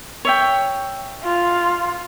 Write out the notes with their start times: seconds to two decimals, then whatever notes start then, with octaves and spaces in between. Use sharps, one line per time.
0.25 C#5 E5 G5
1.24 F4